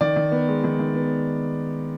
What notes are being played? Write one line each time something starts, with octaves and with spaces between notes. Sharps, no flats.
D#3 D5
D#3
B3
G#3
D#3
D#3
B3